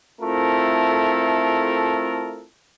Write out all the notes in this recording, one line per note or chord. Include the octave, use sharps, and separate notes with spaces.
A3 C4 E4 F4 A4 A#4